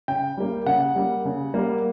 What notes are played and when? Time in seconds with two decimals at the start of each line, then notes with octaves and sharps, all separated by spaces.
0.08 C#3 G5
0.37 G3 A#3
0.66 C#3 F#5
0.96 G3 A#3
1.25 C#3
1.54 G3 A#3